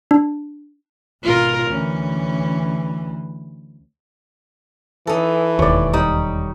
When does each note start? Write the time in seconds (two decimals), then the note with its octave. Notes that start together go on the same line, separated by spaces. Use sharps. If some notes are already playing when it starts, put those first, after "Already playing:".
0.11 D4
1.23 G#1 B2 F4 A#4
1.70 D2 E3 C#4
5.07 E3 D#4 A4
5.59 E1 D#2 C#5 D5
5.93 G3 D#4